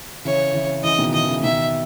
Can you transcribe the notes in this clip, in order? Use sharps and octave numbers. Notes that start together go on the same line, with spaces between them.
C#3 E3 C#5
C#3 E3
C#3 E3 D#5
B2 D#3
C#3 E3 D#5
C#3 E3
B2 D#3 E5